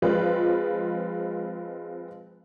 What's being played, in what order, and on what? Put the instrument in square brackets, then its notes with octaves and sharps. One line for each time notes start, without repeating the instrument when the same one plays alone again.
[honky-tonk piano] F3 G#3 C4 F4 B4